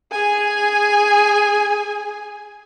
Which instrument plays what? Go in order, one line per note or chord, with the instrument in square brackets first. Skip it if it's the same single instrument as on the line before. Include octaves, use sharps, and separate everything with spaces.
[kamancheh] G#4 G#5